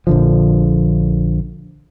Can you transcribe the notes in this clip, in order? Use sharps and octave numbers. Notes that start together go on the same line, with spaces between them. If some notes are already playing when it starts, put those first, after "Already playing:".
A#1 D3 F3